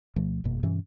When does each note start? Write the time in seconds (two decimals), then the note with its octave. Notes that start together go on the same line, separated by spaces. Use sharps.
0.16 D2 B2 F3 A3
0.44 G1 F2 B2 A#3
0.63 G2 B2 E3 C#4